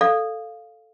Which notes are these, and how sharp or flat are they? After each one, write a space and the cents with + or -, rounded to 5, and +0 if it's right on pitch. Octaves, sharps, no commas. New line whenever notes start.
A4 +0 D5 +0 F5 +0